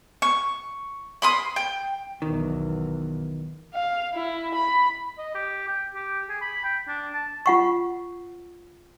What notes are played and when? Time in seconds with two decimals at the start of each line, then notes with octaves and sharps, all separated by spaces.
0.22 C#6
1.22 B5 C6 D#6
1.56 G5
2.22 B1 E2 D#3
3.74 F5
4.14 E4
4.55 B5
5.18 D#5
5.35 G4
5.68 G5
5.94 G4
6.29 G#4
6.41 B5
6.64 G5
6.87 D4
7.14 A5
7.46 F4 F#5 C#6